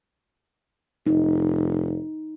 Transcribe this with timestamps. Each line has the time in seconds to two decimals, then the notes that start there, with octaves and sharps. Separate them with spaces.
1.07 F1 D#4